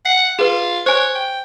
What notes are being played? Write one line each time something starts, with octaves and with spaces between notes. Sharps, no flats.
F#5 C7
F4 G#4 B4
C5 C#5 G#5 F#6
G5